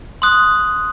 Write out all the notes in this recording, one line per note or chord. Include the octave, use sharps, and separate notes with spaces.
C6 D#6 F#6